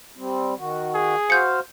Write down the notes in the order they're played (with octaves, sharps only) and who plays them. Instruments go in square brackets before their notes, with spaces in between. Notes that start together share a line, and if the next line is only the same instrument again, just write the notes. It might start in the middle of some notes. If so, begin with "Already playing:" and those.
[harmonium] G3 C4
D#3 F#4
[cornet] G#4
[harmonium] F#4 C5 F5 [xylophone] G6 C#7